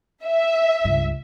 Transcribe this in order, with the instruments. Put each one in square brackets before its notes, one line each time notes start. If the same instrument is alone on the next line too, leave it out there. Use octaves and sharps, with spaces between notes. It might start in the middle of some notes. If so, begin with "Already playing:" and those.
[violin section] E5
[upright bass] C#2 G2